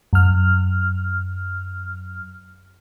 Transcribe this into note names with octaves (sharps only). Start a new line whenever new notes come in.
F#2 F6